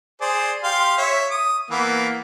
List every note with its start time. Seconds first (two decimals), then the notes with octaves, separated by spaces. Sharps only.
0.21 G#4 C5 D5
0.64 G4 F5 C6
0.98 C#5 E5
1.31 D#6
1.70 E3 A#3 B3